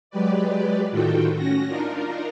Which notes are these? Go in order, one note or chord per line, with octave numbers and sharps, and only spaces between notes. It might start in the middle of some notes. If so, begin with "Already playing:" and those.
F#3 G#3 G4 B4 D5
A2 D#3 F4 F#4 A4 G5
C#4 F#4 A#6
D4 D#4 F4 A#4